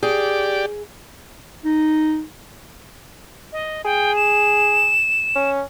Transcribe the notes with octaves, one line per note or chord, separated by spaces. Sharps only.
G4 G#4 D5
D#4
D#5
G#4 G5
E7
C#4